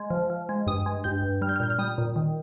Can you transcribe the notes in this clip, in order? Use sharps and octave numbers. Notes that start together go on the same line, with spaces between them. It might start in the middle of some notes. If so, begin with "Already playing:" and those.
Already playing: G#3
F3
F3
G#3
G2 D#6
G#3
G2 G6
G2
G3 F6
G6
F6
A#2 G6
F6
G3 D#6
A#2
D#3